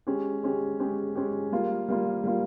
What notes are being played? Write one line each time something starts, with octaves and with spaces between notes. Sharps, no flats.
G#3 C#4 G4
G#3 C#4 G4
G#3 C#4 G4
G#3 C#4 G4
G3 A#3 F4
G3 A#3 F4
G3 A#3 F4